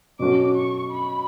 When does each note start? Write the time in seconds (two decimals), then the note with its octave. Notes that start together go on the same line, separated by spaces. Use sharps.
0.19 B2 F#3 C#4 F#4 A4 D6
0.55 C#6
0.92 B5